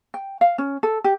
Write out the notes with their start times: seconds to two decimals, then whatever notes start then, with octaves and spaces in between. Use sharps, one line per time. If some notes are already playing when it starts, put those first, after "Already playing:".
0.14 G5
0.41 F5
0.58 C#4
0.83 A4
1.04 G4